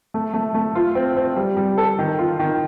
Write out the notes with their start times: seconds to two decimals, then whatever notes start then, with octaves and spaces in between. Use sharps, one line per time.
0.14 A3
0.34 A3
0.54 A3
0.75 F4
0.95 C4
1.16 C4
1.36 G3
1.57 G3
1.78 A4
1.99 D#3
2.19 F4
2.39 D#3